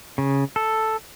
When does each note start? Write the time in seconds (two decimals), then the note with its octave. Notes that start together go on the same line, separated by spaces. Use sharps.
0.18 C#3
0.56 A4